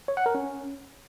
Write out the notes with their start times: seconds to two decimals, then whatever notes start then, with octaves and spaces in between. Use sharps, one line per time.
0.08 C#5
0.17 F#5
0.26 A#4
0.35 C#4